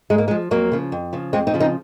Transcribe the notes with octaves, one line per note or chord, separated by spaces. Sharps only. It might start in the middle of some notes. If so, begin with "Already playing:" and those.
G#2 G#3
A#3
G#3
F3
F2 F#3 A#3
C#3 F3
F2
C#3 F3
F2 G#3 C4
C4 D#4
C#3 F3
C4 D#4